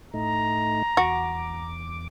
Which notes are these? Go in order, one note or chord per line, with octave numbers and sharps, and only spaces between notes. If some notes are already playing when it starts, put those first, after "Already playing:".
A2 A3 D#4 A#5
E2 F#4 D6